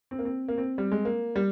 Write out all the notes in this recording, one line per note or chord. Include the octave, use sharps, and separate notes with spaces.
C4
A#3
C4
A#3
C4
G3
G#3
A#3
G3